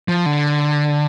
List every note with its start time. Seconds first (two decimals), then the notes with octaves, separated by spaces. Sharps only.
0.08 F3
0.26 D3